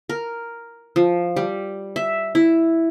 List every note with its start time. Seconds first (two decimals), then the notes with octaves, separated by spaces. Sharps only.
0.09 A#4
0.96 F3
1.36 G3
1.96 E5
2.35 E4